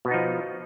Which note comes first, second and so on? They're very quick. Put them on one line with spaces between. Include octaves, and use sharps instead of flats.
B2 B3 D#4 F3